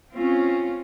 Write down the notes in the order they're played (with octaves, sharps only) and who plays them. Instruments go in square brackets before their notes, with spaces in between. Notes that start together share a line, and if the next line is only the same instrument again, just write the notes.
[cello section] C4 C#4 F4